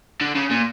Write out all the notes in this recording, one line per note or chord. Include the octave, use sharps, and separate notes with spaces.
D3
C#3
A#2